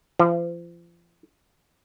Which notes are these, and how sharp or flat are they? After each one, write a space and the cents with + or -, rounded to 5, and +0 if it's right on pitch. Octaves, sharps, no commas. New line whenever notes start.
F3 -35